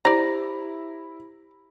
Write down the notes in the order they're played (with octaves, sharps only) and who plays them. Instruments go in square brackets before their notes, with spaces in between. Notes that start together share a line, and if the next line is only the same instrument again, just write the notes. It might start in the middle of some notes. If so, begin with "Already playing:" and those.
[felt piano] E4 [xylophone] G4 C5 A#6 [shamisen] D5 A#5